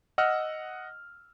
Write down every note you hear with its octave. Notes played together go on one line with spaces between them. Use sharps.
D#5 F#5 E6 F6